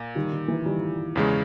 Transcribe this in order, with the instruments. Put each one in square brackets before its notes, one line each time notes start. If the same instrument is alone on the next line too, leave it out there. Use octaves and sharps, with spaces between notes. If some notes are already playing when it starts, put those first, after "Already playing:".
Already playing: [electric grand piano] A#2
[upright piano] D#3 G3
D#3
E3
D#3 G3
[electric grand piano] E2 C#3 G#3